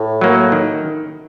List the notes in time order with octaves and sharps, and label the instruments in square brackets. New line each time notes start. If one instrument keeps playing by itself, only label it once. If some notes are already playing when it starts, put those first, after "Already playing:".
Already playing: [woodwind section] A2
[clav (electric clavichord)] F#3 A#3
D#3